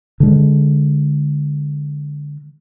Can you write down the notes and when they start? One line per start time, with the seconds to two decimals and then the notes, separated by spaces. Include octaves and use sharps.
0.20 D3 G#3